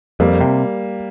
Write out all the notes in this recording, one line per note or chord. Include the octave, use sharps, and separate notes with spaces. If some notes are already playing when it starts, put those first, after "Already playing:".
F2 G3 A#3
C3